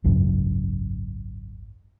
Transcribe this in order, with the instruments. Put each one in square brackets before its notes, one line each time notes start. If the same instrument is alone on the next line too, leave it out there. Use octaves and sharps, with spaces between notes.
[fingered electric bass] G#1 C#2 F#2